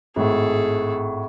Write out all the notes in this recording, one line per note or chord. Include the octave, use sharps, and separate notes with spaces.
G#1 A2 G#4 A4